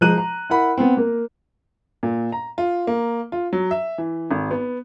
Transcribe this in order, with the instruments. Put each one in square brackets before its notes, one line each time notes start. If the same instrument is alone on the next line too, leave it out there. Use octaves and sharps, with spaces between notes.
[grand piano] F3 G#3 A#5 F#6 D#7
A#5
E4 A#4 F#5 B5
B3 C4
A#3 A#4
[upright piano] A#2
A#5
F4
A#3
F4
F#3
E5
E3
G#1
B3